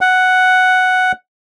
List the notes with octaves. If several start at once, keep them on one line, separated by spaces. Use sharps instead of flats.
F#5